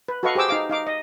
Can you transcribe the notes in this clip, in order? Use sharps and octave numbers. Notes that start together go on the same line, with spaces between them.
B4
F#4 A4 B4 D#5 F5 C#6
G4 G#4 C5 D6 E6
D#4 F5 D6
D#4 F5 D6
D#5